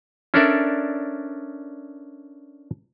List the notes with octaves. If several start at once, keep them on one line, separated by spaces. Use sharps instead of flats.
C#4 D4 A4 A#4 D5 E5